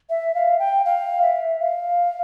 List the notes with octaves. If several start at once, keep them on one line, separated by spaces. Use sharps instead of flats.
E5
F5
G5
F5
E5
F5